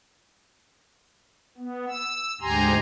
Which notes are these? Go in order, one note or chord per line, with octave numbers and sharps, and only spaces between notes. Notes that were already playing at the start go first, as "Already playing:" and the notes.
B3
E6
D2 G#2 G4 G#5 A#5 C6